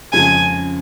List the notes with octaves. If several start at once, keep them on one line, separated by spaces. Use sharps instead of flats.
F2 C#3 G#3 G#5